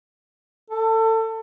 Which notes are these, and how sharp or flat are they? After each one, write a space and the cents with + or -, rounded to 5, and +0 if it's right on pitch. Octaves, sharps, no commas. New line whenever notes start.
A4 +25